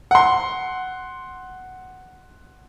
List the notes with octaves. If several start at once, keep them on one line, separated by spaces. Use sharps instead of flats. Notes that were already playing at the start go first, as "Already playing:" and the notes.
F#5 C6